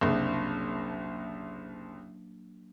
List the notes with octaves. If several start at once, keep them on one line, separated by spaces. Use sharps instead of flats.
F#1 C2 F#3 A#3 D4